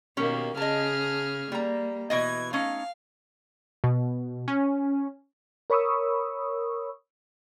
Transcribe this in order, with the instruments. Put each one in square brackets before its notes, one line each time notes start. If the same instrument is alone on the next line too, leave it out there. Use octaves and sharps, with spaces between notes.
[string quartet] B2 D#3 A#3 [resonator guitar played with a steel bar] C#4 G4
[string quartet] C#3 G#4 F6 [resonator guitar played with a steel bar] D#5 A5
[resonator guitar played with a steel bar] G3 A#5 [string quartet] A#3
[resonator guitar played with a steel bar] B2 E3 D#5 [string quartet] G#6
[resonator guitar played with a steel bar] A3 C#4 D#4 [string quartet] F5
[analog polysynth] B2
C#4
[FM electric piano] A#4 C#5 B5 C#6 D#6 E6